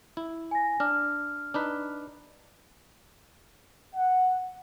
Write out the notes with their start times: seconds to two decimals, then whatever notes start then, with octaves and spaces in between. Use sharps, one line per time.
0.17 E4
0.51 G#5 A#6
0.80 D4 F6
1.54 D4 D#4 B4
3.95 F#5